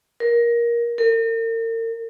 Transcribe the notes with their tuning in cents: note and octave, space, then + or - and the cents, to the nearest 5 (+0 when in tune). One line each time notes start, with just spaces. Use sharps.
A#4 +15
A#4 -40